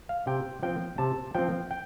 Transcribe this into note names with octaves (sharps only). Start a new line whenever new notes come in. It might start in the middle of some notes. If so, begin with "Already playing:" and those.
F5
C3 G5
F3 C4 G5
C3 A5
F3 C4 G5
G5